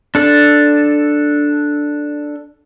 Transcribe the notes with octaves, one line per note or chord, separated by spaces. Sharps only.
D4 A4